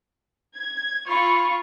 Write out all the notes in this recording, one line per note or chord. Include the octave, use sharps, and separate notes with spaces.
G#6
F4 B5 C#6